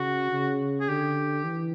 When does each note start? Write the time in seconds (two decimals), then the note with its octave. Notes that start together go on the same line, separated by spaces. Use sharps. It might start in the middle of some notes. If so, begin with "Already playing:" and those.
Already playing: C#3 F#4
0.32 C#3
0.80 G#4
0.89 D3 G4
1.44 E3